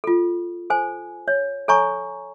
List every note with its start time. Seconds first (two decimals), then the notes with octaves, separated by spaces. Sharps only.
0.04 F4 A4
0.70 A4 C5 G#5
1.28 C#5
1.68 A4 C#5 G#5 A#5 C#6